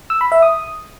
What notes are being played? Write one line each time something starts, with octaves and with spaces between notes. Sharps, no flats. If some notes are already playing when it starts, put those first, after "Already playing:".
E6
B5
E5
D#6